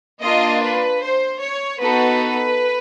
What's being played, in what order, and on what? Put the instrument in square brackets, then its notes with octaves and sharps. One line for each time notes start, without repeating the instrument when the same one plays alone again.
[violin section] A#3 D4 F4 D#5
B4
C5
C#5
B3 D#4 F#4 A4 B4